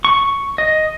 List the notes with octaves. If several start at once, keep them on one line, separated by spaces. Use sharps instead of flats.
C#6
D#5